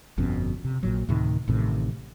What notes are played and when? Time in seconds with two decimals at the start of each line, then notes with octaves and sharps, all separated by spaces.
0.18 G1 F2 B2 C#4
0.65 C3
0.83 A#1 A#2 F#3
1.08 D2 A2 C3 D#3
1.48 A1 A2 C3 D#3